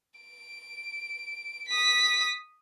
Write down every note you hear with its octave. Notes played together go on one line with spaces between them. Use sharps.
D7
D#6 B6